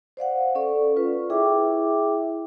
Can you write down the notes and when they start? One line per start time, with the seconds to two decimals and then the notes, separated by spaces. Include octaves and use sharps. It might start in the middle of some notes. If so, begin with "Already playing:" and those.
0.17 C5 D5 F5 F#5
0.55 C#4 A4 D5 C#6
0.96 F4 B4
1.30 E4 G#4 E5 G5 D6